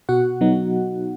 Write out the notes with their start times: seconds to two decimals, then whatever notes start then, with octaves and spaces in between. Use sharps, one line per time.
0.09 B2 F#4 F#5
0.41 F#3 B3 D#4